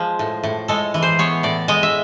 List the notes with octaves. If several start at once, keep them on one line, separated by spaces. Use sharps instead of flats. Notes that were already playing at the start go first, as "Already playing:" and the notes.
Already playing: F3 G#3 G#4
A2
A2
G#3 A4
E3
C5
B3 C#5
A2 D5
G#3 D#5
E5